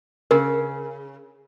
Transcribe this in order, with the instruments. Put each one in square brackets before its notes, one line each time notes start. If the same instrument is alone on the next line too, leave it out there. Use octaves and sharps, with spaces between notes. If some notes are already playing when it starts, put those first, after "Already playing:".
[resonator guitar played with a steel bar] C#3 [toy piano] A#4